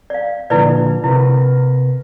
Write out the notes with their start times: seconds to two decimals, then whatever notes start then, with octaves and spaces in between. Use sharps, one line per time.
0.10 D5 F5
0.50 A#2 D3 F3 E4 B4 D5
1.04 C3 E4 A#4 B4